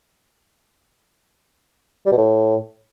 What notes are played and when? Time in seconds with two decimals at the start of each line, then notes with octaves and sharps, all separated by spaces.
2.06 G3
2.12 B2
2.18 A2